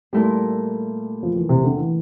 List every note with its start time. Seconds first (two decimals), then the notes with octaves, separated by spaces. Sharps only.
0.13 A#2 G3 A3 E4 A#4
1.23 F3
1.36 E3
1.49 C3
1.64 D3
1.77 E3